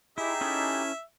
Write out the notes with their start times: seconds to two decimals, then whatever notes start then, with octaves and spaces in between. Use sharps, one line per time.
0.18 D#4 E4 G4 G#4 E5
0.41 C#4 E4 A4